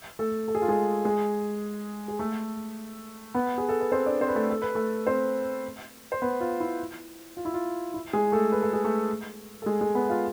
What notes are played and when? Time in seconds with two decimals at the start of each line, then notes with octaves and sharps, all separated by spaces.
0.19 A3 A4
0.48 A4
0.55 G#4
0.62 F4
0.68 G#3 G#4
1.05 G#3 G#4
2.08 G#4
2.19 A3 A4
3.34 B3 B4
3.58 G#4
3.69 A4
3.80 B4
3.92 C4 C5
4.06 D4 D5
4.21 C4 C5
4.28 B4
4.35 A3 A4
4.50 A4
4.62 B4
4.75 A3 A4
5.07 C4 C5
6.12 C5
6.22 B3 B4
6.40 F4
6.60 E4
7.37 F4
7.45 E4
7.54 F4
7.94 E4
8.13 G#3 G#4
8.32 A3 A4
8.52 B4
8.63 A4
8.73 G#4
8.84 A3 A4
9.62 A4
9.66 G#3 G#4
9.81 G#3 G#4
9.95 B3 B4
10.09 F4 F5